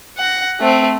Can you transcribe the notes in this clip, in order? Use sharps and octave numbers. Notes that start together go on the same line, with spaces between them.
F#5 A#6
A3 C4